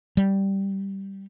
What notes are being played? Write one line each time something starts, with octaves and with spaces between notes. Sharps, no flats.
G3